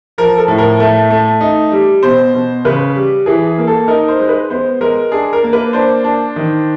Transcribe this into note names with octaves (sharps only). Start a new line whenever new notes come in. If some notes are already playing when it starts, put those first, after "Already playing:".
F3 A#4
A4
A2
A#4
A3
A3
D#4
G3
B2 C5
B2
C#3 B4
G3
E3 G#4
G#4
A#3
A4
D#4 A#4
C5
G#3
B4
B3 C5
G#3 A#4
D4 G#4
A#4
A#3
B4
D4 C5
D4
D#3